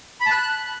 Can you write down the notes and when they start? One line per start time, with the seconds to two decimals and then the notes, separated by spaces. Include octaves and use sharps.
0.21 B5
0.26 A5
0.31 F#6